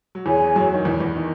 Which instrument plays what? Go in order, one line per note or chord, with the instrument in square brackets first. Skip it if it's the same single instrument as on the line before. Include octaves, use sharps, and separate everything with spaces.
[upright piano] F#3
[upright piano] E2 E3 [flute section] G#4 C#5 G#5
[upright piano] F#2 F#3
D#3
E2 E3
E2 E3
D#3